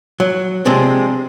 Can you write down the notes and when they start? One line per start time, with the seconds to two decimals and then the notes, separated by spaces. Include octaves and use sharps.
0.20 F#3
0.65 C3 F3 G#3 C4 D4